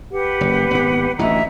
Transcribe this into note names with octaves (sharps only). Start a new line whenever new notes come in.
G4 B4 F#5
F#1
G#1 B3
A1 D2 E3 D#5 E5 A#5